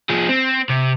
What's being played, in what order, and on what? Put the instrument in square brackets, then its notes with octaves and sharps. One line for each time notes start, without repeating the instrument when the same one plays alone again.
[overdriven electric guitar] F3 G#4
C4
C3